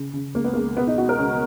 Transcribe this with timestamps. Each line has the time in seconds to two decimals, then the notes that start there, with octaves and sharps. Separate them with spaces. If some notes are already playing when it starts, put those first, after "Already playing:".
Already playing: C#3
0.14 C#3
0.35 C#2 A#3
0.44 B3
0.54 A#3
0.56 C#2
0.77 B2 B3
0.87 D#4
0.98 B2 F#4
1.09 A#4
1.19 C#2 C#4